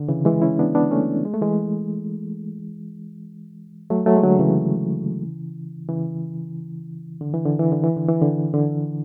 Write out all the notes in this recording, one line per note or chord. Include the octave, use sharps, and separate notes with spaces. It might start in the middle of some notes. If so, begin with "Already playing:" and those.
Already playing: D3
C#3 E3
E3 G#3
C#4 E4
B3 D4
B3 D4
A3 C#4
G#3
A3
E3 G#3
F#3 A3
F#3 A3
G#3
D3 F#3
C#3 E3
C#3 E3
D3
E3
D3
E3
D3
E3
D3
E3
D3
D3